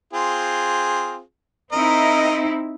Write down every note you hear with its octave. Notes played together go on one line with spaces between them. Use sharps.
C4 F4 G#4
C4 D#4 E4 A#4 D#5